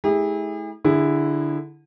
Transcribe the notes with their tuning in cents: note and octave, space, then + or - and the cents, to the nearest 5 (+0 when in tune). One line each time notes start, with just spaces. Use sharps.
A3 -40 E4 -30 G#4 -45
D3 +0 E4 +0 G#4 -25